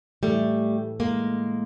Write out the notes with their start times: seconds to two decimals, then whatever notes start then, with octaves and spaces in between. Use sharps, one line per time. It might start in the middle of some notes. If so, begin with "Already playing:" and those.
0.22 A2 E3 G3 A3
1.00 G#3 A#3